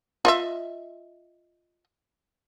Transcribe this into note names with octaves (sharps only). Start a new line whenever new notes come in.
F4 D#5 E5